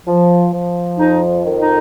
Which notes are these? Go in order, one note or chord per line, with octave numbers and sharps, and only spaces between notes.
F3
F3
F2 D#4
D#3
D#4